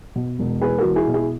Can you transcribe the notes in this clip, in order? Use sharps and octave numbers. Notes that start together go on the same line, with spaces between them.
B2
E1
E2 G#4 B4
F#4 A#4
E2
E4 G#4
B2
E4 G#4